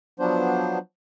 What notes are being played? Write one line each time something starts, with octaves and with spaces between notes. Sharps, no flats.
F3 F#3 B3 D4 C5